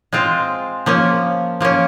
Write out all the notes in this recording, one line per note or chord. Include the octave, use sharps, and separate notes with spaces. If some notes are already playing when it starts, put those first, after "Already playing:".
G#3 C4 F4
F3 A#3 C#4
F3 A#3 C#4